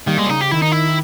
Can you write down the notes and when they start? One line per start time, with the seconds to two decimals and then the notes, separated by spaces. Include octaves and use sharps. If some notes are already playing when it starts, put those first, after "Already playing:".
0.07 D#3 G3 A#3
0.18 G#3
0.25 C#4
0.29 C#3 D#4
0.41 G4
0.51 D#3 E4
0.62 D#4
0.72 E4